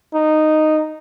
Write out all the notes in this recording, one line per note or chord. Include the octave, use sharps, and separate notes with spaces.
D#4